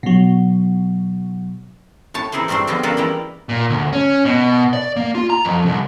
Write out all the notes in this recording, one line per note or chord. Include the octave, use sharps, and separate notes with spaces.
B2 F#3
A2 C#5 A5
E3 D#4 E4 G#4 C5
G3 A3 C4 D4 C5
D3 F3 G3 G#3 B3 C4
A#3 C#4 D4 F4 F#4 A4
E3 G3 G#3 E4 G4 A#5
A#2
D2
C#4
B2
D5
A#3
F4
A#5
F2
C2